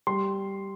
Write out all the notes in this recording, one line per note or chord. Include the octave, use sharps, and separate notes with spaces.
G3 C6